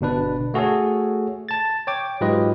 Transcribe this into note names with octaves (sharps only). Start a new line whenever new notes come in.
G1 B2 D4 B4
A3 F#4 G#4 A4 C#5
A5 A6
C#5 G5 D6
G#2 F#3 F4 G4 B4 D#5